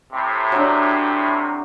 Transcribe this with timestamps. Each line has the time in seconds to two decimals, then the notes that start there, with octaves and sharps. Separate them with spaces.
0.13 A2 C3
0.52 F#3 D4